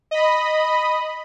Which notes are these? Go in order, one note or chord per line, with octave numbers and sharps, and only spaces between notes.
D#5 B5